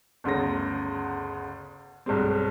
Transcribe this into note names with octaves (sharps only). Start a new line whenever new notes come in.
G1 D2 C#3 B3 A#6
B1 G2 G3 G#3 C4